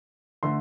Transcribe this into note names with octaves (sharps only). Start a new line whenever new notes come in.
D3 A3 C6